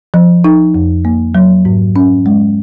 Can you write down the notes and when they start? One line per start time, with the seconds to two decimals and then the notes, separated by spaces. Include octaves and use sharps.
0.14 F3
0.44 D#4
0.74 F2
1.05 A#3
1.35 F#3
1.65 G#2
1.96 C#4
2.26 G#3